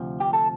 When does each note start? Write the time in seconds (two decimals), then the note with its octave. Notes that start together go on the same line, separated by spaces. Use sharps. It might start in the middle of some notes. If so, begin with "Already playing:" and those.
Already playing: D2 C3 F3
0.20 G4
0.33 A4